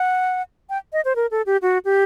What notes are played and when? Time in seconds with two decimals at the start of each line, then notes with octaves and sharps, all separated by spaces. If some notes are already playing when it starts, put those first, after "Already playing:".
Already playing: F#5
0.70 G5
0.93 D#5
1.05 C5
1.16 A#4
1.31 A4
1.46 G4
1.62 F#4
1.85 G4